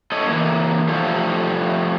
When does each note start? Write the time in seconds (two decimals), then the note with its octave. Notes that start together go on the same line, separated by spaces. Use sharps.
0.12 A2 A4 C#5 D#5
0.27 E3 F3 A#3
0.89 F3 G3 A3